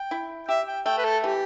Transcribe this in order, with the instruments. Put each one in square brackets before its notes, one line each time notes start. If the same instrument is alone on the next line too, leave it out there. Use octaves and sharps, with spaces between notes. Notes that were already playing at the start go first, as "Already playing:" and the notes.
Already playing: [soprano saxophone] G5
[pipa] E4
[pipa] G4 [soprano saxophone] E5
[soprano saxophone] G5
[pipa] A3 [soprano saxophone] G5
[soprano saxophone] B4
A4
[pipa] E3 [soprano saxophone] G4